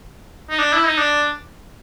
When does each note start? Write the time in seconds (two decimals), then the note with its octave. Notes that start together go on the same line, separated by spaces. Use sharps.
0.49 D#4
0.59 D4
0.73 E4
0.86 D#4
0.98 D4